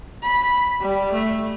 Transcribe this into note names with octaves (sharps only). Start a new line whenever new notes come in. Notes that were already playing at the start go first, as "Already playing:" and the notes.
B5
G3
A3